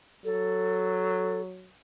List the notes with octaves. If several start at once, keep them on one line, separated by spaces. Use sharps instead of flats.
F#3 A4